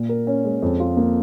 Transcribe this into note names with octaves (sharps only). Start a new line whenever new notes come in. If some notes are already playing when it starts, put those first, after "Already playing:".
Already playing: A#2
A#4
C#4
G#3
F2
F4
A#3